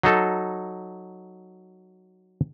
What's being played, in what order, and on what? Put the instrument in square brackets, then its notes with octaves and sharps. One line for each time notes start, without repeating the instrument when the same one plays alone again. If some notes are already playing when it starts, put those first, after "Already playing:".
[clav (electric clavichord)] F#3 D#4 A4